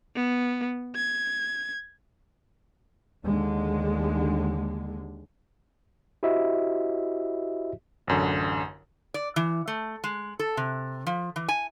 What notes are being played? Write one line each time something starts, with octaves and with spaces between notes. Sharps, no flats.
B3
G#6
D#2 D3 G#3
E4 F#4 G4 C5 D#5 E5
A1 F#2 D3
D5
E3
A3
G#3
A4
C3
F3
E3
G#5